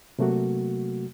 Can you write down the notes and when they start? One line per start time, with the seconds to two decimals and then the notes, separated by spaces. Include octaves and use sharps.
0.19 C3 F#3 A3 A#3 F#4